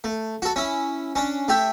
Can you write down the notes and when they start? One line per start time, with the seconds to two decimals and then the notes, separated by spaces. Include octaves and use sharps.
0.04 A3
0.42 F#4 A4
0.56 C#4 E4
1.15 C#4 D4
1.48 A3 G4 E5